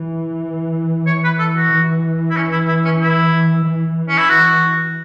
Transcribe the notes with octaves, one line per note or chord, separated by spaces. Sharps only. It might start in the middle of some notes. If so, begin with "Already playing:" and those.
Already playing: E3
C#5
B4
A4
F#4
E3
E4
C#4
E4
E4
C#4
E4
E3
C#4
E4
F#4